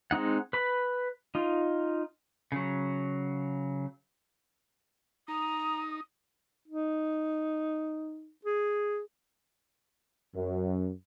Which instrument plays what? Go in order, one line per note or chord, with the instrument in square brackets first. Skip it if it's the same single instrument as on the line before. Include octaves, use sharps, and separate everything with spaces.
[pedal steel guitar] G#3 C4 D#4 F#5
B4 B5
D#4 F4
C#3 F#3
[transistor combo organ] D#4 [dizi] A#5 [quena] D#6
[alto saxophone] D#4
G#4
[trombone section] F#2